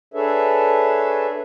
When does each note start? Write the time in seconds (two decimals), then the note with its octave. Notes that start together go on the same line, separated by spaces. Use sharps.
0.14 D4 G#4 A4 B4 C#5 E5